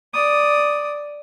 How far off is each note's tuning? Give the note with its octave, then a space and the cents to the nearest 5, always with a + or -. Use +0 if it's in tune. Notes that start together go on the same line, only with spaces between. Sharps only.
D5 +0 D#6 +0